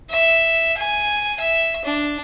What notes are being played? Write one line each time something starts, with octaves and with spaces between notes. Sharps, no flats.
E5
G#5
E5
D4